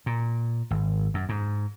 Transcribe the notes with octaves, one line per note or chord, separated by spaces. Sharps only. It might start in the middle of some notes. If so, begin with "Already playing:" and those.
A#2
G#1
F#2
G#2